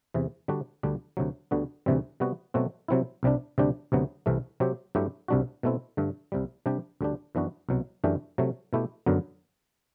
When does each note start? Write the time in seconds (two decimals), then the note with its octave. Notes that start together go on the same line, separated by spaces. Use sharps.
0.14 E2 C3 E3
0.48 D3 G3 D4 F#4
0.83 D2 D3 G3 D4
1.17 D2 C3 F#3
1.51 D2 D3 G3 B3 F#4
1.86 D2 C3 E3 G3 C4
2.20 C3 G3 B3 F#4
2.54 B2 F#3 A3 C4 F#4
2.88 C3 F#3 C4 E4
3.23 C2 C3 G3 D4
3.58 D2 C3 G3 D4 G4
3.92 D2 C3 F#3 B3
4.26 C2 C3 E3 A3
4.60 C3 F#3 C4 G4
4.95 G2 F#3 A3 E4 G4
5.28 C2 C3 G3 D4 F#4
5.63 B2 A3 C4 E4
5.97 G2 D3 A3
6.32 C2 C3 G3
6.66 C3 G3 D4 G4
7.01 D2 D3 G3 D4 G4
7.35 F#2 E3 B3 D4 F#4
7.69 C2 B2 F#3
8.04 F#2 E3 A3 D4 G4
8.38 C3 F#3 A3
8.73 B2 A3 E4 G4
9.06 F#2 D3 F#3 B3